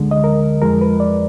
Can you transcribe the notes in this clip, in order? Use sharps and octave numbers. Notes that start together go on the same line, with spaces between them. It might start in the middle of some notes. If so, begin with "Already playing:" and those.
Already playing: D2 D3 G#3
D#5
A#4
F2 F3 G#3 A#4
B4
D5